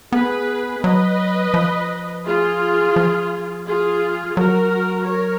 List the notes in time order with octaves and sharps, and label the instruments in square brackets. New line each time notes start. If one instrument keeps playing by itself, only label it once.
[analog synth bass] B3 [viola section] G#4 B4
[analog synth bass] F#3 [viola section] B4 D#5
[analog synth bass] F3
[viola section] F4 G#4
[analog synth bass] F3
[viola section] F4 G#4
[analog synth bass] F#3 [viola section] F#4 A#4
[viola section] A#4 C#5